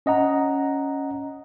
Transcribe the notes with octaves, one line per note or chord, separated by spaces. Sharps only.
C#4 D#5 F#5 A#5